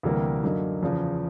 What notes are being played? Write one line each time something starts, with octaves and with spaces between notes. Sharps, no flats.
D2 C3 E3 G3 A#3
F#2 D3 F#3 A#3 D#4
E2 C#3 F3